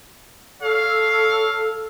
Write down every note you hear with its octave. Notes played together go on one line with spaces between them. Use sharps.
A4 C#5 F5